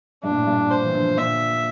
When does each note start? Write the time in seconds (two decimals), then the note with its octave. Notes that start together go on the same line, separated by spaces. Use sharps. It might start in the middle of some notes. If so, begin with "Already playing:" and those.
0.23 G2 D4
0.30 A#2
0.35 A2
0.46 G2 A#2
0.71 C5
0.84 E3
0.93 D3 F3
1.17 A#2 D3 E5